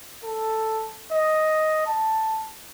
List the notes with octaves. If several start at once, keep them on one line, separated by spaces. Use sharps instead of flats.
A4
D#5
A5